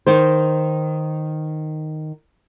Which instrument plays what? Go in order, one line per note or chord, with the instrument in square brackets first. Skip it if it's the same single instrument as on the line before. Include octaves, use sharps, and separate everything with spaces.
[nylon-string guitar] D#3 C5